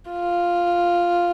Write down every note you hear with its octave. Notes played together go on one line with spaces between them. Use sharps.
F4